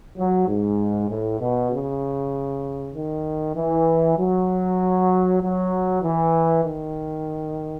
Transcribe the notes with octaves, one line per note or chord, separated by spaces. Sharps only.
F#3
G#2
A2
B2
C#3
D#3
E3
F#3
F#3
E3
D#3